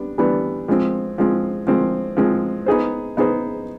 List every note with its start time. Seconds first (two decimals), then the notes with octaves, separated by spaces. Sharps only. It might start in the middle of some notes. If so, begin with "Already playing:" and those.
Already playing: G3 B3 D4
0.18 E3 G3 B3 D4
0.68 F3 G#3 C4
1.18 F3 G#3 C4
1.67 F3 G#3 C4
2.17 F3 G#3 C4
2.66 B3 D#4 G#4 C5
3.17 B3 D#4 G#4 C5